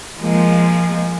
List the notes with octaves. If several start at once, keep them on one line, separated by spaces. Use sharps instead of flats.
F3 G#3 A#3